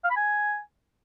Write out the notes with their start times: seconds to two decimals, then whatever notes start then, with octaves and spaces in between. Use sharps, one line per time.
0.04 F5
0.10 B5
0.17 G#5